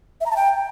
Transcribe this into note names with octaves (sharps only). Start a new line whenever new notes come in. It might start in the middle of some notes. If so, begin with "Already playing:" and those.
E5
A#5
A5
G5